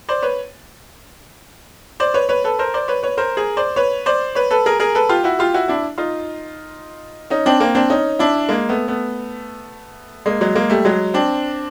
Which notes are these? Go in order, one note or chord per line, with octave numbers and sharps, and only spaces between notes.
C5 D5
B4 C#5
C5 D5
B4 C#5
B4 C#5
A4 B4
A#4 C5
C5 D5
B4 C#5
B4 C#5
A#4 C5
G#4 A#4
C5 D5
B4 C#5
C5 D5
B4 C#5
A4 B4
G#4 A#4
G#4 A#4
A4 B4
F4 G4
E4 F#4
F4 G4
E4 F#4
D4 E4
D#4 F4
C#4 D#4
C4 D4
A#3 C4
C4 D4
C#4 D#4
D4 E4
G#3 A#3
A3 B3
A3 B3
G#3 A#3
F#3 G#3
G#3 A#3
G3 A3
F#3 G#3
C4 D4